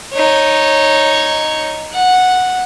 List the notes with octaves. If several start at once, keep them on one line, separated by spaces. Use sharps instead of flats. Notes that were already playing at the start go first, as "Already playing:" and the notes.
D#4 C#5
F#5